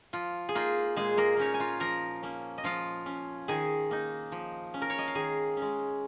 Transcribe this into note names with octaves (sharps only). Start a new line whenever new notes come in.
F3 F4
G#4
A#3 D#4 F4
A#2 G#3 G#4
A#3 A#4
A#3 C#4 D#4 C#5
G#5
F4 F5
F3 A#4 A#5
A#3 C#4
D#5
F3 F4 F5
C#4
D#3 G#4 G#5
A#3 D#4
F3
C#4
A#4
C#5
D#5
F5
D#3 G#4 G#5
G#3 C#4